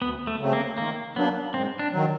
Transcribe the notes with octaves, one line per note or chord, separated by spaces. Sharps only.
D2 B3
A3
C#3 F#3 A3 C4
A#3
D#3 A#3
F#3 A#3 B3 D4
G#2 C4
D4
D#3 F#3